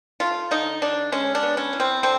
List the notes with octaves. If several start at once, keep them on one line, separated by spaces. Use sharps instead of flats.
A3 F4
D3 D#4
D3 D4
G#3 C#4
D4
B3
C#4
E3
C4
D3 C4